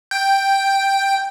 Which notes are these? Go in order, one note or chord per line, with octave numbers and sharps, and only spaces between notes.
G5